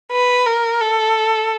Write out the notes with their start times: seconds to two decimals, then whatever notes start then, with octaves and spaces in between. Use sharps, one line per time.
0.12 B4
0.47 A#4
0.81 A4